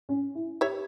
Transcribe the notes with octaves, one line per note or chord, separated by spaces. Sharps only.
C#4
E4
G4 C#5 E5